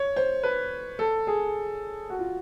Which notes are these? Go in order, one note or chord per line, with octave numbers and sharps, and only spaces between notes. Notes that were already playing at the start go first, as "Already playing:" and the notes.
Already playing: C#5
C5
B4
A4
G#4
F#4
F4